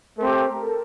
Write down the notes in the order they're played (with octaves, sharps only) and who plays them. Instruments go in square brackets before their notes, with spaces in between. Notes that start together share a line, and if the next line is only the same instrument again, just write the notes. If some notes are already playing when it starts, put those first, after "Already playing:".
[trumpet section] A3 C4 G4 [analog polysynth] A#4
[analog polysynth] A#4
A4